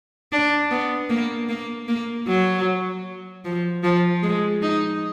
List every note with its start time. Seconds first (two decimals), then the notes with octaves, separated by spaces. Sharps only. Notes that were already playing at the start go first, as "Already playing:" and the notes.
0.32 D4
0.71 B3
1.10 A#3
1.49 A#3
1.88 A#3
2.28 F#3
3.45 F3
3.84 F3
4.23 G#3
4.62 D#4